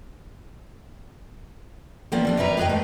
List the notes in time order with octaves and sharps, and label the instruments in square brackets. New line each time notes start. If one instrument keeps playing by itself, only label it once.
[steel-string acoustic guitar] F3 G3 A#3 B3 C#4 F5
G3 C4 D4
F#2 G3 A#4 B4 A#5
B3 G#4 B4 D#5 G5
G#3 A3